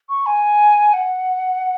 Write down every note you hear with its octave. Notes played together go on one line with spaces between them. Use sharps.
C#6
G#5
F#5